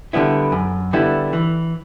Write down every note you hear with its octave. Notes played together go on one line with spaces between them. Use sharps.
D3 G3 B3 E4
F#2
D3 G3 B3 E4
E3